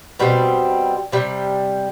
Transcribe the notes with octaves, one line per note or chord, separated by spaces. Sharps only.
B2 G3 C4
C3 G3